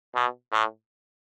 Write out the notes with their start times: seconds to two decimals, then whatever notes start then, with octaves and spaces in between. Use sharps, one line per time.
0.15 B2
0.52 A2